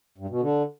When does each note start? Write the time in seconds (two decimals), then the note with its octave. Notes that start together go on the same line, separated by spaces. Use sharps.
0.18 G2
0.30 B2
0.41 D3